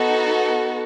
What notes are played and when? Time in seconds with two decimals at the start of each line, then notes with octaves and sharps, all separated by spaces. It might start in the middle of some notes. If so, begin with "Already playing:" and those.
Already playing: B3 D#4 F#4 A4